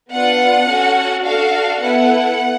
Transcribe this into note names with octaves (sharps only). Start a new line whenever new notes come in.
B3 D4 F4 F#5
C#4 F#4 A4
D4 F#4 A4 F5
B3 E4 A4 F#5